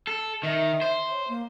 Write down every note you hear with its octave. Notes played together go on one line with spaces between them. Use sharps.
A4
D#3 E5
C5
C#5
A#3